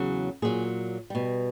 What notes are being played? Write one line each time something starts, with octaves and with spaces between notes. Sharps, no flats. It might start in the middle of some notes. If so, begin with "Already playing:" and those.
Already playing: E2 C#3 F#3
A#2 F#3 G#4
B2 G3